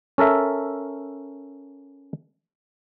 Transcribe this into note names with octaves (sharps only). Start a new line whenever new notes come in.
C#4 A4 A#4 E5